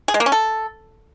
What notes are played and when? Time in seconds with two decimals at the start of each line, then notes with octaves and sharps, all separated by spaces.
0.08 G#4
0.14 G#3
0.20 A#3
0.26 C#4
0.32 A4